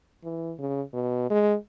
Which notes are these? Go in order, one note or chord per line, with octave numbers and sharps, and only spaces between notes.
E3
C#3
B2
G#3